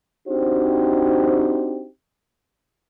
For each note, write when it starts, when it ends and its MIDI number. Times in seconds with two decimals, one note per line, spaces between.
0.28 1.86 60
0.28 1.86 62
0.28 1.86 63
0.28 1.86 66
0.28 1.86 67
0.28 1.86 72